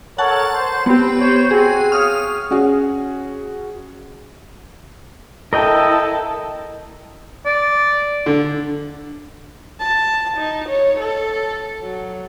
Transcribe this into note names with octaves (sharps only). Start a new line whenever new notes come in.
A4 A#4 C#5 F#5 A5
C5
B3 C4 G4 C5
C5 C#5
C4 F#4 G#4
C#5 F5 D#6 F6
C#4 F#4 G#4
E4 A4 A#4 D#5 G5
D5
D3
A5
D#4
C#5
A4
F#3